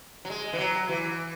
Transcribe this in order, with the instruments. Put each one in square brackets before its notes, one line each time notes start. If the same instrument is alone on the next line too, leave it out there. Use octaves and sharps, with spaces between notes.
[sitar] F#3
G#3
E3
F#3
E3